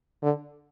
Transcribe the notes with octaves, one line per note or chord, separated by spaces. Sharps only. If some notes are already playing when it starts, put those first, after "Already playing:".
D3